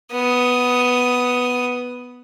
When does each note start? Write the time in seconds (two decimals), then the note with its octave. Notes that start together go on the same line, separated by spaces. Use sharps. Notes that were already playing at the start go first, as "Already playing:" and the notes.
0.12 B3 D#6